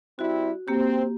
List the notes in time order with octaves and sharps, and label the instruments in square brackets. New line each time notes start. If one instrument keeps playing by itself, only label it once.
[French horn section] G3 C4 E4 [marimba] F#4
[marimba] A#3 G4 [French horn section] C4